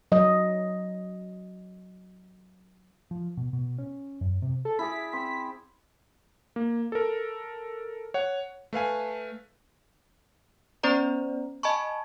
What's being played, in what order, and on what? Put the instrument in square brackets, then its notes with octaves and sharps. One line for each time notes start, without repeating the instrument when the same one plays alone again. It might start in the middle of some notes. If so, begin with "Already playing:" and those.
[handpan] F#3 D#5
[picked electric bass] F3
B2
B2
C#4
F#2
C3
[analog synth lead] A4
[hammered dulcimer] E4 G#4 D5 [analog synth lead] B6
[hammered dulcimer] C4
[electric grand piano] A#3
A4 A#4
C#5 F#5
A3 B4 F5 G#5
[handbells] B3 C#4 C5 D5 A#5
D#5 G#5 A5 B5 C#6